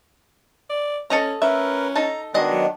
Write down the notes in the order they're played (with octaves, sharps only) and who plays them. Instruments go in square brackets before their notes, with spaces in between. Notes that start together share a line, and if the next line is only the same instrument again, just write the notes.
[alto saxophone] D5
[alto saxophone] C#4 [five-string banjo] A4 D#5 A#5
[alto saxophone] C#4 [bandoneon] A#4 B4 [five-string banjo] E5
[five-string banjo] D#4 A4 A5 [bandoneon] A#5
[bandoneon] D#3 B3 D4 [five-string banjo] G#3 D#5 [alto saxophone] F#4
[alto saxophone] F#3